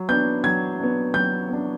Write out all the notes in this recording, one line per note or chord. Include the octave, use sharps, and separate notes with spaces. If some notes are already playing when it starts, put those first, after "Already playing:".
Already playing: F#3
B3 D4 G6
F#3 G#6
B3 D4
F#3 G6
B3 D4